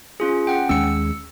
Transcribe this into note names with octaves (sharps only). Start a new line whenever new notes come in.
C#4 F4 G#4
C#4 F#5 G5
D#2 G#3 C#4 E6 C#7